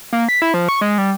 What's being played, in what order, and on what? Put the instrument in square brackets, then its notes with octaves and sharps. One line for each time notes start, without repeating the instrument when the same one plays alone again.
[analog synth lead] A#3
B6
E4
F3
C#6
G#3
G3